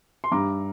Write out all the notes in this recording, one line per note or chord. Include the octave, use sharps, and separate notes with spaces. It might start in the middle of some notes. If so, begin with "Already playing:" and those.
C6
G2 A#5 D6